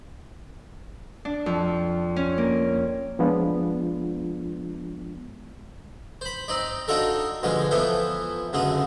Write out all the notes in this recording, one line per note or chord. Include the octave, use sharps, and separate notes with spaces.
D4
F2
C#4
A#3
F3 G#3 B3 D4 F4
C5 B5
C4 D#4 D5
D4 D#4 F4 F#4 A4 A#4
B2 D3 F3 G#3
E3 F3 B3 A4 C5
C#2 F#2 D3 D4 D#6